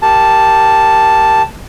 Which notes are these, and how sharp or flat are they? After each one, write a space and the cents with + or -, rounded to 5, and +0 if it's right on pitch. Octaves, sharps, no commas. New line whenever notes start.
G4 +0 A#4 +0 A5 +0